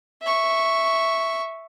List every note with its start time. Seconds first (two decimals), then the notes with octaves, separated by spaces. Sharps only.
0.22 E5 C#6